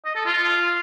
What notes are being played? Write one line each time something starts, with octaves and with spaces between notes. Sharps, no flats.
D#5
A4
F4